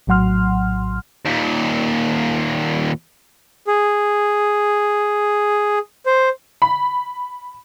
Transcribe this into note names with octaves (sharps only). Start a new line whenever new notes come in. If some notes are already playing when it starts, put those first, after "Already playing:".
A#1 A2 F#3 F#5 C6 F6
D#2 A#2
G#4
C5
B5